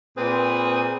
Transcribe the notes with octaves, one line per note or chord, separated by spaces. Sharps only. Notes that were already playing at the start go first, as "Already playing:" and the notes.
A#2 C4 G#4 B4